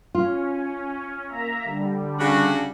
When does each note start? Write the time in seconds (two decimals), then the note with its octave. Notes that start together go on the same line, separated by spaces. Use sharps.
0.15 C#4 F4
1.28 A#3 E5 A#5
1.64 D3 G3
2.19 C#3 D4 F#4